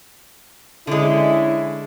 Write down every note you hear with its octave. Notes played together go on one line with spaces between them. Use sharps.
D3 G#3 C#4 E4